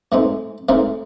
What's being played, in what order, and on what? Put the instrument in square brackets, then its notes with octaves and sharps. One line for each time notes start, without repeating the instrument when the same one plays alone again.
[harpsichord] A2 E3 G#3 C4 D#4
A2 E3 G#3 C4 D#4 A#4